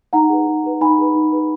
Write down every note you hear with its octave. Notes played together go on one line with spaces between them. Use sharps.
D#4 F#5 A#5
G#4 B4
D#4
G#4 B4
D#4 G#5 B5
G#4 B4
D#4
G#4 B4